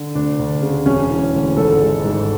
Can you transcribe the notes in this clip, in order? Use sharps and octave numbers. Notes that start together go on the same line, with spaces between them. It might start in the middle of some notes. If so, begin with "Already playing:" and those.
Already playing: D3
D2 D4
D2
C#3
E1 C#4
E3
D2
G#1 A4
G#3
G#2